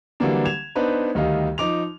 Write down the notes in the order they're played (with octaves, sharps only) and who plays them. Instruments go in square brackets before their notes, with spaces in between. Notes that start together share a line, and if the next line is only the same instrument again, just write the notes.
[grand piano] D3 E3 F#3 G3 A#3 D4
G#6 E7 F7
B3 D4 D#4 B4 C5
D2 D#3 G3 D#5 F5
F3 D#4 D6 F7